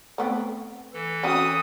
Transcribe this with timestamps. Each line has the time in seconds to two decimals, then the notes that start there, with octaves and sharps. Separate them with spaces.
0.18 A3 B3 C4
0.93 E3 A4
1.23 C4 C#4 F#4 D#6